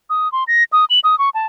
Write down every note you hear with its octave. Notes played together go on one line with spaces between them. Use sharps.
D#6
C6
A#6
D#6
F#7
D#6
C#6
A5